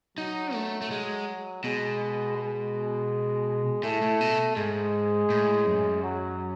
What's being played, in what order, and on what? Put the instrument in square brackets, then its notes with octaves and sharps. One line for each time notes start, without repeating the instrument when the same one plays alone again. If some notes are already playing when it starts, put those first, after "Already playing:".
[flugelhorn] F#3 [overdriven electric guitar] D#4
[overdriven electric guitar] A3
A3
G#3
[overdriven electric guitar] B2 [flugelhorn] G#3
[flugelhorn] G#3
[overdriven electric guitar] A2 [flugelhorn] A3
[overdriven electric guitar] A2
B2
[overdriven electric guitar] G#2 [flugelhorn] G#3
[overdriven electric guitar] A2
F#2
[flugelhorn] F#3